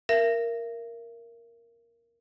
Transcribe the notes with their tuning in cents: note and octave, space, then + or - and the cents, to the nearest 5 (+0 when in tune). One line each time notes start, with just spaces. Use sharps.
A#4 +0 E5 +35